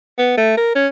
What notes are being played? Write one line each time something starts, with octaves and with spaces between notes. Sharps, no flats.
B3
A3
A#4
C#4